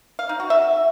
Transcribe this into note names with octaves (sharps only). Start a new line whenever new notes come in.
F5
D#4
F#4
E5